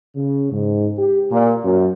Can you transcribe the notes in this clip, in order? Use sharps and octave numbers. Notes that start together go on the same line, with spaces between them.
C#3
G#2
G4
A#2
F#2